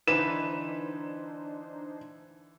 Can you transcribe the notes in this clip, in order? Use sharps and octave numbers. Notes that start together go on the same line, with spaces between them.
D3 E3 D4 D#4 B4 C5 E7